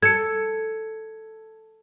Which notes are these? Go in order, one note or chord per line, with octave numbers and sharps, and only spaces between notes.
A4 G#6 C#7